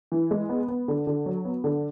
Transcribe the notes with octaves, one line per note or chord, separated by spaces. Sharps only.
E3
G#3
B3
B3
D3
D3
F#3
B3
D3